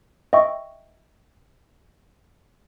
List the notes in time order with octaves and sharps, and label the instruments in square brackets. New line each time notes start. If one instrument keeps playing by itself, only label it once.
[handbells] D#5 E5 G5 C#6